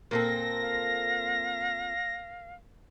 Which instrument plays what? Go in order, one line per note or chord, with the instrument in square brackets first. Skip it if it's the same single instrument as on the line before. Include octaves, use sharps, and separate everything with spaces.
[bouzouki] A#2 C4 A4 [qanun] A#3 [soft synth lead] A#6
[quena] F5